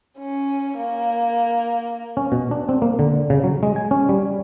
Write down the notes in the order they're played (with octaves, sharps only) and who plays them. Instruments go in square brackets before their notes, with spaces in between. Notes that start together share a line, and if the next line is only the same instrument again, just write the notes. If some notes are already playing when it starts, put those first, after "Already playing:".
[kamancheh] C#4
A#3
[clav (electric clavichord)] C#4
B2
D4
C4
A#3
D3
C#3
F#3
G#3
G#5
C#4
G3